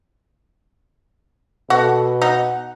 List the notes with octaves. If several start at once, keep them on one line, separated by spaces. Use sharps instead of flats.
B2 F#4 A4
D#4 F#5